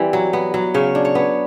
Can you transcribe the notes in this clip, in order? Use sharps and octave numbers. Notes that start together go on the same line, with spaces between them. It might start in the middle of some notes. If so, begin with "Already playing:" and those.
Already playing: E3 G3 C4
F#3
B3
F#3
C#3 C#5
D4
C#5
B3